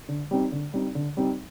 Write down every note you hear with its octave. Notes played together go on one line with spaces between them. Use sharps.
D3
G3 C4 D#4
D3
G3 C4 D#4
D3
G3 C4 D#4